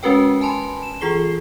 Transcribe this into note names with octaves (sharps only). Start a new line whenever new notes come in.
G#3 C#4 F#4 A#4 B4 G5
G#5 A5 B5 C6
E7
E3 F4 G#4 C7 G7